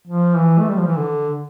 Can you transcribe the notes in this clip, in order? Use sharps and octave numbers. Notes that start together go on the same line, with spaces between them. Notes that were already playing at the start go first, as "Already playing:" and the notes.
F3
E3
A3
G3
F3
E3
D3